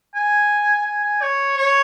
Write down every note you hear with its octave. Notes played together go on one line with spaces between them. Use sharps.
G#5
G#5
G#5
C#5
C#5